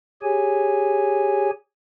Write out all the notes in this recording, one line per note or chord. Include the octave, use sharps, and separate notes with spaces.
G4 G#4 C#5 G#5